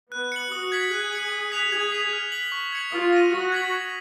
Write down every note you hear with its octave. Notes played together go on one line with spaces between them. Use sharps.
B3 F#6
C#7 F#7
F#4 D#6
G#6 B6 F#7
G#4 F#6
C#7 F#7
D#6
F#6 B6 F7
G#4 G#6
B6 F7
F6
B6 F#7
C#6
G#6 C#7 F#7
F4 D#6
A#6 D#7
F#4 D#6
G#6 B6 F#7
G#6